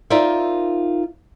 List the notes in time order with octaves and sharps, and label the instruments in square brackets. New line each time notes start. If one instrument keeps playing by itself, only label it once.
[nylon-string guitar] D#4 F4 A#4 C5 D5 E5